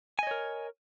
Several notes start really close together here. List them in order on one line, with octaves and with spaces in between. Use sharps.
G#5 D#5 C#5 A#4